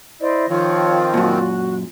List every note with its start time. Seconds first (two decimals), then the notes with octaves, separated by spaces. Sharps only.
0.20 E4 C5 D5 D#5
0.49 D#3 F3 C4 F4 C#5
1.14 F#2 A#2 F#4